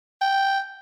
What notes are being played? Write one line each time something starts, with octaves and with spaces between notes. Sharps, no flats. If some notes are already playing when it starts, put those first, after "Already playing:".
G5